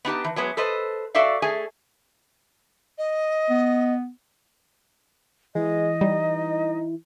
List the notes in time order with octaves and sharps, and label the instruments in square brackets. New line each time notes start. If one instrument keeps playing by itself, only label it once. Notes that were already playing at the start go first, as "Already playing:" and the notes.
[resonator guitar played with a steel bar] B3 D#4 G4 A5
E3
F#3 G#3 B3
A4 B4 C5 D#5
F#4 A4 D5 E5 F5
A3 G#4 G#5
[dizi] D#5
[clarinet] B3
[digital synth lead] E3 [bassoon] G#3 [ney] D#5
[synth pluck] G3 [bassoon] D#4